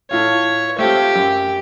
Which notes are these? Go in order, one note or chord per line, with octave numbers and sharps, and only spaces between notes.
A2 F4 C#5
A3 C4 F4 G4
F#2